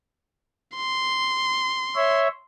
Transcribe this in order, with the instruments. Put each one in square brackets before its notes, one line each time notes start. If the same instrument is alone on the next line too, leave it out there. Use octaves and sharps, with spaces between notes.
[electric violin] C6
[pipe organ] C#5 E5